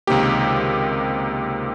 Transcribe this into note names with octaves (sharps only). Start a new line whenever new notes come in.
C#2 C3 D#3 A#3 G4